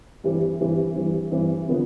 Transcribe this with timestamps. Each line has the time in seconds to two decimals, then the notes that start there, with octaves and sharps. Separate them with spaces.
0.24 G2 E3 G3 C4
0.60 G2 E3 G3 C4
0.96 G2 E3 G3 C4
1.32 G2 E3 G3 C4
1.68 D3 F3 B3